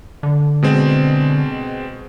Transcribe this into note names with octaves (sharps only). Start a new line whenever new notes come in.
D3
B2 G#3 C4